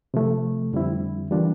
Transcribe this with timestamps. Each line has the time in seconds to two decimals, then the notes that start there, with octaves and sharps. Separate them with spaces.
0.14 C3 F3 A3
0.72 F2 D3 G3 C4 E4
1.31 E3 G3 A#3 D4 F4